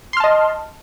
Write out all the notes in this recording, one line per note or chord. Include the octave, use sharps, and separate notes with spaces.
D#5 A5 C6 F6